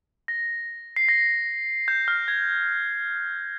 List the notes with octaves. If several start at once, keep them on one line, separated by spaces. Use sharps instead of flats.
A#6
C7
A#6
G6
F6
G#6